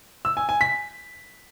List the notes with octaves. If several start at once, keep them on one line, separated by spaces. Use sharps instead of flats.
E6
G#5
G#5
B6